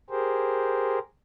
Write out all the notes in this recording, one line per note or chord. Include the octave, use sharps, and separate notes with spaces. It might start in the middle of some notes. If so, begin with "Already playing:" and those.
G4 G#4 A#4 C5